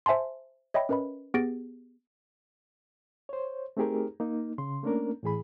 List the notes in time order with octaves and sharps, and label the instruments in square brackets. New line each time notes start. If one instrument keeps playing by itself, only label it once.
[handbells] C5 E5 G#5 A5 C6
C#5 D#5 E5 G5 B5
C#4 A#4 B4 D#5 B5
B3 G4 G#4 A6 A#6 D7
[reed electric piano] C5 C#5
A3 C4 D#4 G4 G#4 A#4
A#3 D#4
C#3 C6
A3 A#3 C#4 D4 A#4
A2 E3 G#4 B5